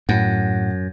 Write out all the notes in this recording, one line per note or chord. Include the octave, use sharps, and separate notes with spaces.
F#2 A2 F#5